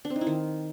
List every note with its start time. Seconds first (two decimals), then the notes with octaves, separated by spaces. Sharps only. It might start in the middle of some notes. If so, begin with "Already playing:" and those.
0.05 D4
0.10 C4
0.16 D#4
0.21 E4
0.27 D#3